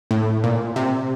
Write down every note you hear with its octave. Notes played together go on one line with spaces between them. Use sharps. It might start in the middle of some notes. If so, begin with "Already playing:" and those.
A2
A#2
C3